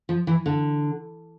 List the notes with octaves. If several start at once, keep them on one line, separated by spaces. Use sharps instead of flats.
F3
E3
D3